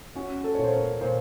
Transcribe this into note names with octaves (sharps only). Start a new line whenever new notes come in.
C#4 F#4
A4
A#2 C#5
C5
A#4
A#2 C5